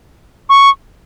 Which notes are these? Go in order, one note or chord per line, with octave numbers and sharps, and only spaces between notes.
C#6